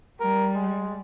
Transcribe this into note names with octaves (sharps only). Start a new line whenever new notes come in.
G3 A#4
G#3